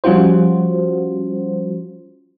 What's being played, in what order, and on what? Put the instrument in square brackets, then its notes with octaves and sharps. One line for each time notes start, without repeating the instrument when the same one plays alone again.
[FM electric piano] F3 G3 C#4 F4 F#4 C5